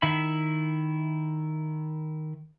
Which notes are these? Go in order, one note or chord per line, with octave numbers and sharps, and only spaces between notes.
D#3 E4 E5 B5